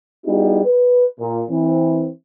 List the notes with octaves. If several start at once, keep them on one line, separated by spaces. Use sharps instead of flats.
G3 B3 D#4 E4 F#4 G#4
B4
A#2
E3 C4